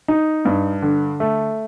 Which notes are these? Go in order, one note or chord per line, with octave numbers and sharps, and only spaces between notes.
D#4
G2
D3
A3